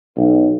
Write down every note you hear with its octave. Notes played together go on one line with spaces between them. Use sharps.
B1